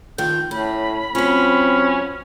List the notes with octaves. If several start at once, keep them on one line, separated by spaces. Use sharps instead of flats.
D#3 F3 F4 G6
A2 C#4 B5
F#3 C4 C#4 F4